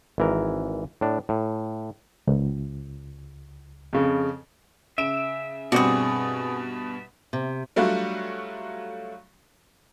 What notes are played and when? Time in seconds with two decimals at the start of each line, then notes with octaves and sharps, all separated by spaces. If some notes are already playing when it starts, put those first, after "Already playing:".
0.18 G#1 E3 A#4
1.01 A2 D4
1.29 A2
2.27 C#2
3.93 F2 C#3
4.98 C#3 E5 D7 E7
5.72 G2 B2 C4 F#4 G#4 D5
7.33 C3
7.76 F#3 G3 A3 D4 F4 F#4